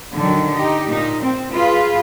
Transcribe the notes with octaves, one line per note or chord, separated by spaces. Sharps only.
A#2 D3 D#3 F#3
D#4 G4
A#2 D#4
C4
F4 G#4 B4